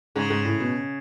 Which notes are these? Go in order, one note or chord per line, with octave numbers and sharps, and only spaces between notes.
G#2 C#3
G#2
A2
B2